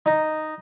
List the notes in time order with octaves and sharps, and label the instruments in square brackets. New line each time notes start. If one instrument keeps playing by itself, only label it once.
[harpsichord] D#4